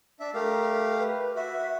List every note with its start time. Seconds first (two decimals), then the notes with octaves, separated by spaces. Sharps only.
0.20 D4 E5
0.34 A3 G4 A#4 F5
0.99 B4
1.36 F#4 E5